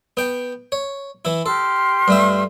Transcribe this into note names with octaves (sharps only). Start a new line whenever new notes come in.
B3 G5
C#5
E3 E4
G4 A4 C6 F6
G2 A3 E5